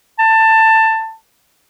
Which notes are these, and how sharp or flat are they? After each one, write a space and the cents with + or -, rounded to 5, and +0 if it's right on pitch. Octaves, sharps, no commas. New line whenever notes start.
A5 +15